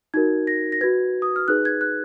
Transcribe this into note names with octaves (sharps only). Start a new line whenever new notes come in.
D#4 F#4 A#4 G#6
A#6
A#6
F#4 B4 G#6
D#6
F6
D#4 G#4 B4 F#6
G#6
F#6